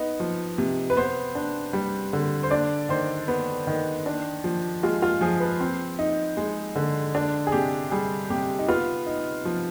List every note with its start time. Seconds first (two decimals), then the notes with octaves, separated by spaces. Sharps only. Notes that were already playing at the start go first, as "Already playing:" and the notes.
Already playing: B3 D#4
0.20 F3
0.58 C3
0.90 B4
0.97 B3 C5
1.35 D4
1.73 G3
2.13 D3
2.43 C5
2.51 D4 D5
2.89 D#3 C5
3.28 B3
3.67 D#3
4.06 D4
4.44 F3
4.83 G#3 F4
5.02 F4
5.21 F3 G#4
5.40 B4
5.60 C4
5.99 D#4
6.37 G#3
6.75 D3
7.15 D4
7.47 G#4
7.52 C3 G4
7.91 G3 G#4
8.30 C3 G4
8.59 D#4
8.68 B3 F4
9.07 D#4
9.45 F3